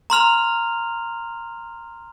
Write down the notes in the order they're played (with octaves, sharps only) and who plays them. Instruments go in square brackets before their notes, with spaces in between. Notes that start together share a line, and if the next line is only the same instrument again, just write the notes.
[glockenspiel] A#5 C6 F6 F7